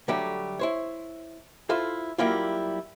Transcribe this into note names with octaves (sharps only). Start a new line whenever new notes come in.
D3 F#3 G3 A3
E4 C5 C#5
E4 F4 A4 C5
F#3 G3 A#3 E4 F4